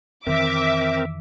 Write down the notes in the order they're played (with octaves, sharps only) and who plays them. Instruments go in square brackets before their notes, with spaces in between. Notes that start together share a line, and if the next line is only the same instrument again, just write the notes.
[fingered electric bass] F2 D#3 E3 [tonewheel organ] C4 A#4 [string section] E5 D6